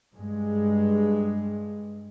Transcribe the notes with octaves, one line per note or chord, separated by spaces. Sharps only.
G2 G#3